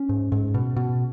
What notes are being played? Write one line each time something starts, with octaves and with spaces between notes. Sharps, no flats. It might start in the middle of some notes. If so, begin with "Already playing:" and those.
Already playing: C#4
G#2
G#2
B2
B2